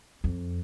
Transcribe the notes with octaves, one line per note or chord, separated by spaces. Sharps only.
F2